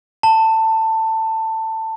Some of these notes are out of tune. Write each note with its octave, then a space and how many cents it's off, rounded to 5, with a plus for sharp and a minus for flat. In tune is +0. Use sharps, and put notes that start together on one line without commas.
A5 +20